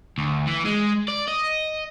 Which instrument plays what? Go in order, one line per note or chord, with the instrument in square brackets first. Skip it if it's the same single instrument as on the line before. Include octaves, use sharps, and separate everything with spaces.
[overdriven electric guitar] D2
E3
G#3
D5
D#5